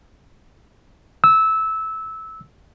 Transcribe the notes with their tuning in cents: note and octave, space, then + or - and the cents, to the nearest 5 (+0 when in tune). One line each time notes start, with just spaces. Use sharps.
E6 -15